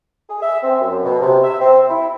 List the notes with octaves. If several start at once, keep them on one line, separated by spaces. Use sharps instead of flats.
G#4
E5
C4
F#2
B2
C3
E5
C4
E4